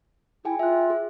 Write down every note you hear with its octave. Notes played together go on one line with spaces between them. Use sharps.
E4 G#4 G5 G#5
F4 E5 F#6
G#4